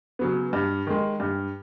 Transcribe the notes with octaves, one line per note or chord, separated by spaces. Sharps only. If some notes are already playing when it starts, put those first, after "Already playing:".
C#3 F#3 B3
G2
D#3 G#3
G2